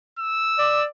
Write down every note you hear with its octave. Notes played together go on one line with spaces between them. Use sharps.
E6
D5